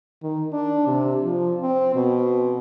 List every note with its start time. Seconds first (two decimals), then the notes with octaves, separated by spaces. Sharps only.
0.23 D#3
0.52 D4
0.87 C3
1.23 F3
1.61 C4
1.95 B2